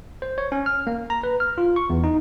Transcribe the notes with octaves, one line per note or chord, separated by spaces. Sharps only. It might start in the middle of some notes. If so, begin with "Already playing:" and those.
C5
C#5
C#4
F6
A#3
A#5
B4
F6
F4
C#6
E2
D#4